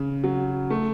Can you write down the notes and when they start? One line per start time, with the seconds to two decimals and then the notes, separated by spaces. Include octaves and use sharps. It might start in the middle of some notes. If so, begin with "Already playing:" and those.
Already playing: C#3
0.24 F#3
0.70 A3